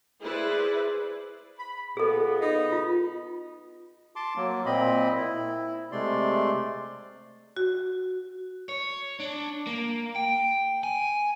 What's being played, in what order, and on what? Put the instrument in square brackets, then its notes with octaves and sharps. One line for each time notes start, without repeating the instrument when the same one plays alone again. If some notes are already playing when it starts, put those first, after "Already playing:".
[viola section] E4 G#4 B4 C5 D5
[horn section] B5
[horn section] A#2 B3 [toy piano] G#4 A4
[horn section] B3 D#4 D#5
[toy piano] F4
[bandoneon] A5 C6 D6
F#3 A#3
A#2 C4 D#5 B5
E4
C3 G#3 A3 D5 C6
[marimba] F#4
[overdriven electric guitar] C#5
D4
A#3
G5
G#5